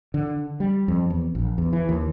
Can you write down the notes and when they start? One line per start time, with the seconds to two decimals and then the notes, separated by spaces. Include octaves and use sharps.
0.14 D3
0.60 G3
0.88 F2
1.10 E2
1.35 A#1
1.58 E2
1.73 E3
1.89 D#2